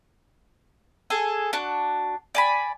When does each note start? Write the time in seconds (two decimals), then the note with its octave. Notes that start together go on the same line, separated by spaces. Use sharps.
1.10 G#4 A4 G#5
1.53 D4 F#4
2.35 D5 G#5 B5